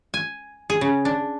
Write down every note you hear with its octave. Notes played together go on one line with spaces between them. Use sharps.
G#5
G#4
C#3
D4